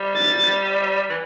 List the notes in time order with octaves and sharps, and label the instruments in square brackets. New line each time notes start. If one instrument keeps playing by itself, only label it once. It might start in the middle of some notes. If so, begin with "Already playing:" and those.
Already playing: [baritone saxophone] G3
[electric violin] A6
[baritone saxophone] E3